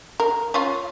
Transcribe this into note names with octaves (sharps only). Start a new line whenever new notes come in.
A#4
C#4 F4